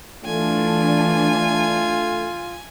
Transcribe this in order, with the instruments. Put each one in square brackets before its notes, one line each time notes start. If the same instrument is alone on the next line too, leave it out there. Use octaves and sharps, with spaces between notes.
[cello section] E3 D4 [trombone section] A3 [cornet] F4 [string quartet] G#5